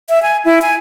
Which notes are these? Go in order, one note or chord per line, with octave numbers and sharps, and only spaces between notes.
E5
G#5
E4
G#5